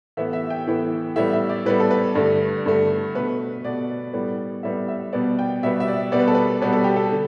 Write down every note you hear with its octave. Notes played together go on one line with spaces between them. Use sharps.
A2 E3 B3 E5
E5
G5
A2 E3 B3
A2 G3 B3 E5
E5
D5
A2 G3 B3 B4
A4
B4
G2 D3 A3
G2 D3 A3
B2 A3 B4
B2 A3 D5
A2 G3 B3
A2 G3 B3 E5
E5
B2 G3 B3 D5
G5
B2 G3 B3 E5
E5
D5
B2 G3 B3 D5
B4
A4
B4
B2 G3 B3 B4
A4
G4
A4
D3